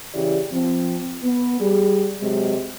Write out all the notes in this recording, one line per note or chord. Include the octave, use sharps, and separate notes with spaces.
C#3 E3 E4 G4 D5
F3 C4
B3
G3 G#4
C3 F#3 G#3